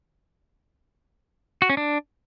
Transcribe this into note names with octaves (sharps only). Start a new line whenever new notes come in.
F#4
C#4
D4